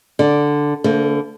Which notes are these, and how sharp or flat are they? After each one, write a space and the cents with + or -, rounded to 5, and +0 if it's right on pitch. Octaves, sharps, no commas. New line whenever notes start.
D3 +0 D5 -5
D3 -25 A3 +45 B4 +45